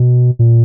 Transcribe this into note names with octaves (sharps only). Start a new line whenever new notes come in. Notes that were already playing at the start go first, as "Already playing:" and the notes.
Already playing: B2
A#2